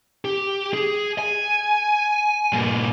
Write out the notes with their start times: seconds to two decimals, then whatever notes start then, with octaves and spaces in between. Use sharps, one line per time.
0.25 G4
0.73 G#4
1.19 G#5
2.53 G2 A#2